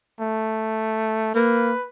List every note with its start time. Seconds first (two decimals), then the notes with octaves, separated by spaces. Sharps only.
0.20 A3
1.35 A#3 B4